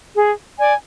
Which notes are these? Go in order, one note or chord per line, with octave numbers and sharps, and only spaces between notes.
G#4
D5 G#5